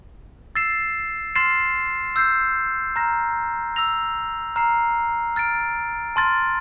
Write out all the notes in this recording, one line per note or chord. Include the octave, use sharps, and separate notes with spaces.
E6 A6 C7 E7
C6 F6 A6 C7 E7
E6 G6 C7
A#5 F6 A#6
E6 A#6 F7
A#5 F6 C7
F6 A6 D7
A5 C6 F6 A6